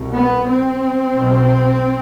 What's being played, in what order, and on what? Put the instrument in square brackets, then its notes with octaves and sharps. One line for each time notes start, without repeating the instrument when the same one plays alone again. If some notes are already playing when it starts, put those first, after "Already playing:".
Already playing: [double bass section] C2 B2
B3
C4
B1 B2